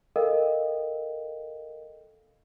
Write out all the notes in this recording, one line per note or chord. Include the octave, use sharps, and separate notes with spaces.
A4 A#4 D#5 F5 G5